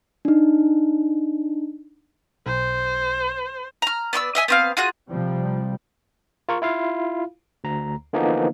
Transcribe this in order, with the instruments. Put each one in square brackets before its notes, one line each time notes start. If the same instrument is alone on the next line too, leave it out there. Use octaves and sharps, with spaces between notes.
[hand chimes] D4 D#4
[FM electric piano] B1 [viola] C5
[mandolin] A#5 F6
B3 D5 C#6 E6
D#5 E5 G#5
B3 C4 F5
F4 F#4 G#4 F#6
[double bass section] C3 F3 G3
[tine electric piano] F4 A#4 C#6
E4 F4 F5
D2 A#5
D3 E3 F3 A#3 B3 D#4